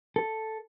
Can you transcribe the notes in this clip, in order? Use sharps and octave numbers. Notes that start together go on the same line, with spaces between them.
A4